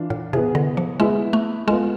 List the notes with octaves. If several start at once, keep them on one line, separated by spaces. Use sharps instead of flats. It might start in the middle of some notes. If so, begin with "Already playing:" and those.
Already playing: E3 D4 F4
A2
C3 B3 E4 G#4
D3
F3
G#3 B3 E4 G#4
A3
G#3 B3 F4 A4